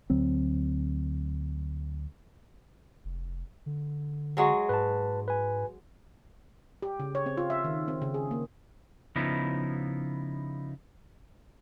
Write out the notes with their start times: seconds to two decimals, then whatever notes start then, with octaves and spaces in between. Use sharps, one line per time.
0.10 D2 F#3 C4
3.05 F1
3.66 D3
4.37 F#3 G#3 F#4
4.69 G#2 B4 A5
5.28 B4 G#5
6.82 G4
7.00 C#3
7.15 C#5
7.26 C4
7.37 F4
7.50 E5
7.64 D#3
7.88 C4
8.02 C#3
8.14 G#4
8.31 A#3
9.16 C#3 F3 B3 D#4 E4